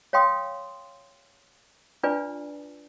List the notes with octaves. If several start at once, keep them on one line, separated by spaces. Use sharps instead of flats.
C#5 F5 G5 C6 D#6
D4 F4 B4 D5 G#5 A5